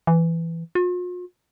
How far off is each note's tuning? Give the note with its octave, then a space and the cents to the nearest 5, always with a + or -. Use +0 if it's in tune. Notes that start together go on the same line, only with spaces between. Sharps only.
E3 +10
F4 +45